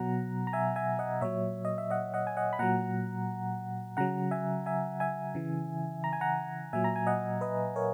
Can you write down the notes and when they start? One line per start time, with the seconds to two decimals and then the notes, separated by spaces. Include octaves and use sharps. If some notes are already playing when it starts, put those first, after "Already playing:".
Already playing: B2 F#3 F#5 A#5
0.47 A#5
0.53 E5 G#5
0.76 E5 G#5
0.99 D#5 F#5
1.21 A#2 F#3 C#5 E5
1.65 D#5
1.78 E5
1.90 D#5 F#5
2.14 D#5 F#5
2.27 G#5
2.37 D#5 F#5
2.53 B5
2.59 A#2 F#3 F#5 A#5
3.97 C#3 F#3 F#5 A#5
4.31 E5 G#5
4.66 E5 G#5
5.00 E5 G#5
5.35 C#3 E3
6.04 A#5
6.13 G#5
6.21 F#5 A#5
6.73 A#2 F#3 E5 G#5
6.84 A#5
6.96 G#5
7.07 D#5 F#5
7.41 B4 D#5
7.76 A#4 C#5